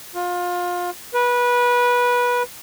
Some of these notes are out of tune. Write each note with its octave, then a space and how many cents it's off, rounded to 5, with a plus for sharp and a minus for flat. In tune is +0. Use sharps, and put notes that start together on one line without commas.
F4 +25
B4 -20